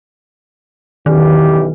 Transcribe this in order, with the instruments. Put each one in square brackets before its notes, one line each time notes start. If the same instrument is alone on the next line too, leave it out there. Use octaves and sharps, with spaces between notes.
[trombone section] B1 E3 G4 [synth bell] D#3